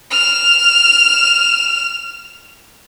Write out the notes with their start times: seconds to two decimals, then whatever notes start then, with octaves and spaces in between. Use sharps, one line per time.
0.11 F6 E7